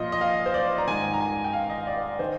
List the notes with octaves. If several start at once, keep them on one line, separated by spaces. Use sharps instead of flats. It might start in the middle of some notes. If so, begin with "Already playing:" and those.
Already playing: A#2 F3 D#5 F5
D#5
F5
C5
D5
A#5
G#2 D#3 G#5
A#5
G#5
G5
F5
D#5
D5
D#3 C5